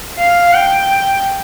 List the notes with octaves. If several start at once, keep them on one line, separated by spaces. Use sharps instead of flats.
F5
G5